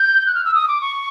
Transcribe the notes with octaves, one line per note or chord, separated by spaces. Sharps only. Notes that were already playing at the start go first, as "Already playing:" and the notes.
Already playing: G6
F#6
F6
E6
D#6
D6
C#6